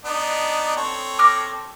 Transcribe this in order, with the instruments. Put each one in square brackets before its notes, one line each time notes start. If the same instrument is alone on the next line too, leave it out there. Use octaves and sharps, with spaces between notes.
[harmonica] B3 D4 D#4
C4 A4 C#5
[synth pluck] D6 F6 A#6